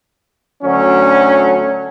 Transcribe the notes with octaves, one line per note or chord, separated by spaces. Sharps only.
D2 D3 F#3 C#4